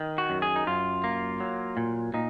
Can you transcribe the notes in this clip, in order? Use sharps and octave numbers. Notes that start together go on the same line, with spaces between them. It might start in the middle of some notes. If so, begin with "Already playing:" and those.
Already playing: D#3
F#4
F#2
G#4
D#4
F#2 F4
A#3
F#3
A#2
A#2 D#4